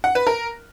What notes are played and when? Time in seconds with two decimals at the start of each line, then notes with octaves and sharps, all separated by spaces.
0.04 F#5
0.15 B4
0.27 A#4